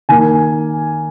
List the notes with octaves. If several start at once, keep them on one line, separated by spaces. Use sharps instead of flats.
D#3 A#3 G#5